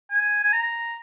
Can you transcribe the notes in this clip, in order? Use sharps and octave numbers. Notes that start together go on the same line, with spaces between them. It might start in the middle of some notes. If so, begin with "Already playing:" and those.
G#5
G#5
A#5